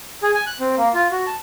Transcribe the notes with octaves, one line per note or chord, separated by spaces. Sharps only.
G#4
G#5
F#6
C4
A#3
F4
F#4
A5